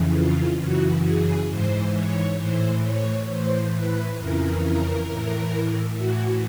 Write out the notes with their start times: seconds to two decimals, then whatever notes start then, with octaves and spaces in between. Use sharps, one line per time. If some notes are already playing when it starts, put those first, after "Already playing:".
Already playing: F2 C#3 E3
0.15 F4
0.60 F#2 C#3 E3 F#4
1.05 G#4
1.49 G#2 E3 C5
1.94 C#5
2.38 A2 E3 C5
2.84 C#5
3.28 A2 E3 C5
3.73 B4
4.18 F2 C#3 E3 A#4
4.63 A#4
5.07 A2 E3
5.97 A2 E3 F#4